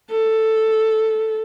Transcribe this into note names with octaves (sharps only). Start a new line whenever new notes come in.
A4